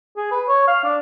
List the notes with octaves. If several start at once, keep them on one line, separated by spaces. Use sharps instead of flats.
G#4
B4
C#5
F5
D4